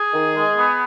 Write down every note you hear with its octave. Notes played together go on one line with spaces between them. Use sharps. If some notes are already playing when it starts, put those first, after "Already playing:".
Already playing: G#4
D#3
G#3
B3